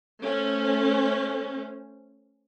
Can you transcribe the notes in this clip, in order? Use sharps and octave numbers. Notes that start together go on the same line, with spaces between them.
A3 C#4 C5